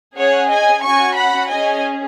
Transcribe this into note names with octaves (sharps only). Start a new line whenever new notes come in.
C#4 G#4 C#5 F#5
D#5 G#5
C#4 F#4 G#5 C#6
F#5 B5
C#4 G#4 D#5 G#5